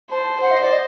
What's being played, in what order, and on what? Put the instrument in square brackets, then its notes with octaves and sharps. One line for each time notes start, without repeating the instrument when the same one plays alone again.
[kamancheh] C5 [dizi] A5
[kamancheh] C5 [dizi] F#5
[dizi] D#5
D5
D#5